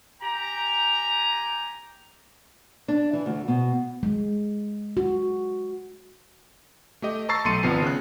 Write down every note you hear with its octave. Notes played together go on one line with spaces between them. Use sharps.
G4 G5 G#5 A#5
D4
E3
D2
B2
G#3
F#4
A3 G4 D#5
A5 A#5 C#6 E6 A6 C7
B1 A3 C6 C#7 D#7
G#1 C3 F3 B3 A5 C7
C#3 F#6